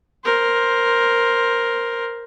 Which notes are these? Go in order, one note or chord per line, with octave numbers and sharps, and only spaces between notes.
A#4 C5